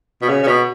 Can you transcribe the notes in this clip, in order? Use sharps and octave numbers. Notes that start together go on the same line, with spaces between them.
B2
C#3
C#3
B2